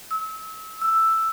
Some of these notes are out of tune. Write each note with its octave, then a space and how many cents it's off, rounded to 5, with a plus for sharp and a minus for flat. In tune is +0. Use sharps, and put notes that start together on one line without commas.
E6 -30
E6 +5